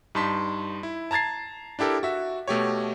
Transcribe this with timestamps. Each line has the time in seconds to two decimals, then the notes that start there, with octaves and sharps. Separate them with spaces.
0.15 G2 D#4 A5 C6 B6
0.83 E4
1.11 A5 A#5 G#6 A6 C7
1.79 D4 E4 G4 A4 A#4
2.03 F#4 E5
2.48 B2 A3 G4 C#5